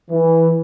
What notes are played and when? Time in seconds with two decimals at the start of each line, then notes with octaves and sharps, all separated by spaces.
0.11 E3